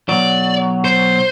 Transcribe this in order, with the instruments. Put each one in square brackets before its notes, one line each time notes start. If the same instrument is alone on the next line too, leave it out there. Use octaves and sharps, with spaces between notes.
[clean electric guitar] B1 F#3 [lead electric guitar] D5
[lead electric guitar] C5